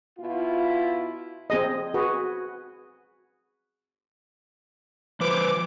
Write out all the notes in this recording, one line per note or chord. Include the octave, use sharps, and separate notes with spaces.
B2 E4 F4
C4 G#4 D#5
F#4 G#4 B4
F3 B4 C5 D6